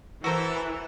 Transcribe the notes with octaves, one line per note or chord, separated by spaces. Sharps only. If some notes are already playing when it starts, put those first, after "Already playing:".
E3 E4 F#4 A4 A#4 C5